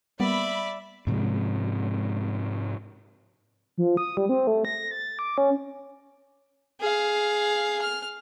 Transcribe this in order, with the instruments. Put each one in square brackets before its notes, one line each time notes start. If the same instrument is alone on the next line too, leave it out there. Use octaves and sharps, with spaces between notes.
[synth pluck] G3 A#3 B3 [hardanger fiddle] D5 E5 [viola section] B5
[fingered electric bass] G#2 C3 F3 G#3
[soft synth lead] F3
D#6
G3
C4
A3
A#6
A6
D6
C#4
[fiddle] G#4 F5
F6